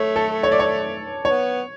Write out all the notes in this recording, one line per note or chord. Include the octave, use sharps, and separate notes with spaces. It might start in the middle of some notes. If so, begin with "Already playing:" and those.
Already playing: A3 C#5
A4
C#5
D5
C#5
B3 C#5